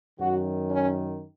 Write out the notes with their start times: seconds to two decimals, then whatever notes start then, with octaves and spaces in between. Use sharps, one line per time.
0.19 F#2 D#3 F#4
0.71 C#4